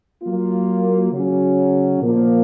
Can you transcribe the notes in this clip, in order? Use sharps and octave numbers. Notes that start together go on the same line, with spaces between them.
F#3 A#3 F4
C#3 F#3 C#4
A#2 F3 A#3